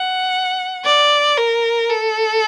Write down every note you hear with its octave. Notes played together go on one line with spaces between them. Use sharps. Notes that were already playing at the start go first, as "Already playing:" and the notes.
Already playing: F#5
D5
A#4
A4